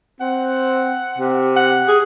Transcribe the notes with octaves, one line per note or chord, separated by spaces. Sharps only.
C4 F#5
C3
F#5
G#4